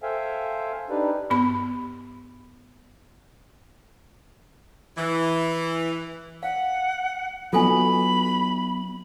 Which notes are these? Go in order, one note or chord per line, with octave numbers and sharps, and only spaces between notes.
A4 C5 E5 F5 G5 G#5
D4 D#4 G4 B4 D5
G2 B3 B5
E3
F5 F#5
F#3 B3 F4 A4 G#5 B5